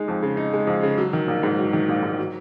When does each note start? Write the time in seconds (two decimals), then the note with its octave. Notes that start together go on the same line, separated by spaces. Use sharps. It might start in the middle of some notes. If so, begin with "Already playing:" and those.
Already playing: G#3 D#4
0.08 F2
0.23 C#3
0.37 D#4
0.53 G#3
0.67 F2
0.83 C#3
0.98 F#3
1.13 D#3
1.28 A#1
1.43 G#2
1.58 F#3
1.73 D#3
1.89 A#1
2.03 G#2
2.19 F#3